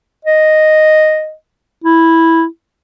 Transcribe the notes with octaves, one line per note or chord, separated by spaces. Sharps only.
D#5
E4